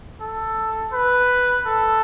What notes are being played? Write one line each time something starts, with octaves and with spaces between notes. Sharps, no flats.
A4
B4
A4